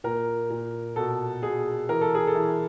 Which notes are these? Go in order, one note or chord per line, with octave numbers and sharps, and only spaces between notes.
A#2 A#4
A#2
B2 A4
B2 G#4
E3 A#4
A4
G#4
A4
E3